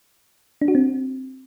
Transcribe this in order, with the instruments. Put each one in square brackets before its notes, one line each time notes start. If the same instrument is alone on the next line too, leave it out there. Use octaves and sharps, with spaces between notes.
[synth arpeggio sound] D4
F#4
C4